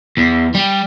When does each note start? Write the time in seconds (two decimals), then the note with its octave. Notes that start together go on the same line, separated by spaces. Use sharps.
0.17 E2
0.54 G3